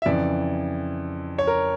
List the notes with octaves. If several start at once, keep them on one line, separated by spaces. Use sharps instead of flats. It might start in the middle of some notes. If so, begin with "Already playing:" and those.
E5
F2 C#3 E3 D5
C#5
A#4